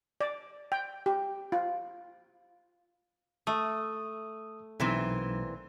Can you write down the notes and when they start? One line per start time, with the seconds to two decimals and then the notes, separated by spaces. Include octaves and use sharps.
0.21 D5
0.72 G5
1.06 G4
1.52 F4
3.47 A3 D#6
4.80 B1 A#2 E3 C4